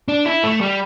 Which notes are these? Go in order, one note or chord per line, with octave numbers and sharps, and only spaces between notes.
D4
E4
A3
G3